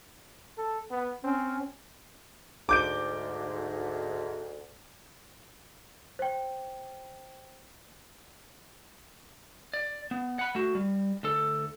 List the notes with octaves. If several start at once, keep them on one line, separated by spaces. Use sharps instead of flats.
A4
B3
C4 C#4
D2 G#2 D6 G6 D7
C5 G5
D5
B3
F#5 B5
A3 F#4
G3
D2 A4